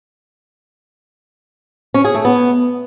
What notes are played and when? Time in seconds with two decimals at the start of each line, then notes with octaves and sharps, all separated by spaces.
1.94 C#4
2.05 G#4
2.15 A3
2.25 B3